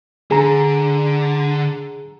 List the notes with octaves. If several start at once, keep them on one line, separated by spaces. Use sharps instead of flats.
D3 G#4 A#5